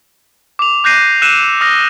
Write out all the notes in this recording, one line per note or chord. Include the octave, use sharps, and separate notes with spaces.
D6 F7
D6 F#6 G6 A#6 C7 D#7
E6 F#6 C#7 D#7 E7
D#6 F6 A#6